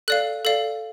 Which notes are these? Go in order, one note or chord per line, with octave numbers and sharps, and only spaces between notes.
A4 D5 F5 F#6
A4 D5 F5